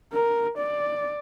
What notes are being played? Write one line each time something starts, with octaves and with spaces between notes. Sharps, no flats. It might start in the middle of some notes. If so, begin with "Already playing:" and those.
A#4
D5